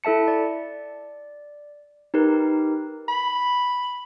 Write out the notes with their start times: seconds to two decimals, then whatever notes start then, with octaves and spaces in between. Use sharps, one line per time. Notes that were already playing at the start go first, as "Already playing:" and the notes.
0.04 E4 A4 E5 A5 C#7
0.28 D5
2.14 D#4 G4 A#4 B4
3.09 B5